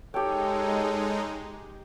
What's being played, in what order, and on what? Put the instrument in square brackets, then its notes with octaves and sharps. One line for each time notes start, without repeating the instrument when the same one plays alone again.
[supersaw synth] G#3 D#4 [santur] G4 G5 [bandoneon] A4 C#5